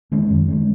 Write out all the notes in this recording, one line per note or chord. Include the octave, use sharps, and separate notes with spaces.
D#3 G#3 C#4
F#2
D#3 G#3 C#4